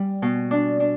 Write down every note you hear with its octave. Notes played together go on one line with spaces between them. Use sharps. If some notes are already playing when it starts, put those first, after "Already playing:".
Already playing: G3
B2
D4
D4